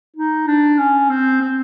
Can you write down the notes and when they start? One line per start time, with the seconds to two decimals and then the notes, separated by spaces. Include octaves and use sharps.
0.16 D#4
0.47 D4
0.78 C#4
1.10 C4
1.41 C4